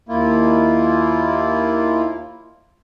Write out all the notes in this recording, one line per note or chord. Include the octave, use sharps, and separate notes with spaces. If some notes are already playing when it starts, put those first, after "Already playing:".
D#2 A#3 E4 F4